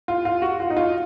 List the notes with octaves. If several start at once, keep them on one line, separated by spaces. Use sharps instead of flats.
F4
F4
F#4
F4
D#4
F4